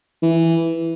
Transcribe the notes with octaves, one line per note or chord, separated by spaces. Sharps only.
E3